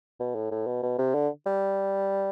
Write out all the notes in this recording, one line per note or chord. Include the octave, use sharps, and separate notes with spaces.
B2
A2
A2
B2
B2
C3
D3
G3